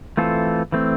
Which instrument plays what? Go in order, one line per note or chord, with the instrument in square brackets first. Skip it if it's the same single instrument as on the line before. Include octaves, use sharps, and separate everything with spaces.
[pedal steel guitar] E3 A3 C4 F4 A4
E3 A3 C4